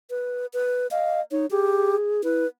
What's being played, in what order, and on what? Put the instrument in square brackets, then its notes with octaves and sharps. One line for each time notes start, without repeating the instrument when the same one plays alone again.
[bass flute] B4
B4
[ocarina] D#5 [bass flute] F5
[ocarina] D#4 [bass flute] C#5
[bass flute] G4 [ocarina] G#4
[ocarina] E4 [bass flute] B4